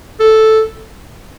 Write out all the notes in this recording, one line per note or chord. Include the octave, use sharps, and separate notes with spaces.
A4